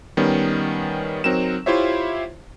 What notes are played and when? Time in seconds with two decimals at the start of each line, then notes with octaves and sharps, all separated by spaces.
0.17 D#3 G3 B3 C#4
1.24 F#3 C4 D#4 A#4 E7
1.66 E4 F4 G4 C5 C#5 E5